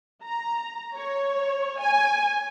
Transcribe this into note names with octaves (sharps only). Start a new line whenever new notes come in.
A#5
C#5
G#5